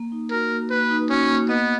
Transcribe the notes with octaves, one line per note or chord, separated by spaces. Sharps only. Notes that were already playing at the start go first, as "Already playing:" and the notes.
Already playing: A#3
D#4
F#4 A#4
A#3
A#3 B4
D#4
C#4 F#4
A#3
B3 D#5